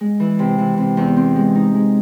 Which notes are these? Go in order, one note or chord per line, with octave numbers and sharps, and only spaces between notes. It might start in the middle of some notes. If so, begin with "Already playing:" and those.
G#3
E3
C3
E3
C3
E2
C4
G#3
D#4
G#3